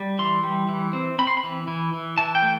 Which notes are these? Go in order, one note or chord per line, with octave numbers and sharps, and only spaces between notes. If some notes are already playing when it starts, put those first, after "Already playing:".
Already playing: G3
E3 C6
G3
E3
C4
C4 B5
C6
B5
E3
E3
E3
E3 A5
G5
A3